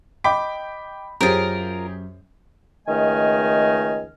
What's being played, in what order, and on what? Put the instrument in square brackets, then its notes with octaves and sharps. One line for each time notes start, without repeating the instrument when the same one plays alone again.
[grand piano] D#5 B5 B6 [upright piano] G5 D6
[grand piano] F#2 C#4 C5 [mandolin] F4 A#4 [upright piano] G4 G#4
[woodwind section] C#2 D#3 A3 D#5 G#5 F6